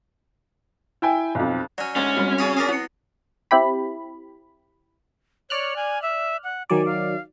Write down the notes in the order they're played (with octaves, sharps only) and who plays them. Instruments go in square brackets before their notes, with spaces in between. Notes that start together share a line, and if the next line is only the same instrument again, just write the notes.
[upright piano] E4 G5 G#5
B1 F2
[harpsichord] F#3 C#4 [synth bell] D5
[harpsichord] D2 G#2 [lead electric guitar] C#4
[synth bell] G3 C4 F#4
[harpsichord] C#3 G#4 C#5
[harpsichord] G#4 A#4 D5 [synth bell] A#6 C7
[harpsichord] B3 [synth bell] E4 C#7
[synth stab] C4 E4 G4 B5
[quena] C#5 [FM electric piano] D5 F6 F#6
[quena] G#5
E5
F#5
[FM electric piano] D#3 F#3 D5 [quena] G#5
[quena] F5